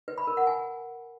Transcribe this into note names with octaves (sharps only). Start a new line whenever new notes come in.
B4
B5
A#4
F#5
G#5